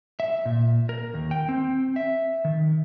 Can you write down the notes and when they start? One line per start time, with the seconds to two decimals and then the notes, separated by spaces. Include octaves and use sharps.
0.20 E5
0.45 A#2
0.89 A#4
1.14 D#2
1.31 G5
1.49 C4
1.96 E5
2.45 D#3